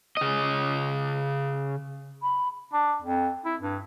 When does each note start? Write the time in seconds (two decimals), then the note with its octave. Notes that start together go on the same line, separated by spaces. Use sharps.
0.17 C#3 D#5
2.22 B5
2.73 D4
3.02 F2
3.45 E4
3.61 G2